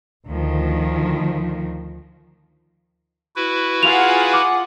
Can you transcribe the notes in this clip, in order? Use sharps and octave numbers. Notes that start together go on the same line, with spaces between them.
D2 D#3 F3
E4 F#4 B4
F4 G#4 F#5 F7
D6